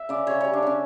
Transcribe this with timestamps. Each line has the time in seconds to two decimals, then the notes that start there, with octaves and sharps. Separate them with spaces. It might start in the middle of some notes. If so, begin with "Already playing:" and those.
Already playing: E5
0.09 C#3 D5
0.27 C#3 C#5
0.41 G3 C#5
0.53 D4
0.62 C#3 C#4